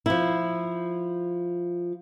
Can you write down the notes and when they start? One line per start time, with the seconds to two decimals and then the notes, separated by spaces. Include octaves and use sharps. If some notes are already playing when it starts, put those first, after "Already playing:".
0.06 F3 E4